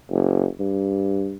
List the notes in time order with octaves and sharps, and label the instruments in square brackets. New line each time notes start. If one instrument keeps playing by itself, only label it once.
[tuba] F#1
G2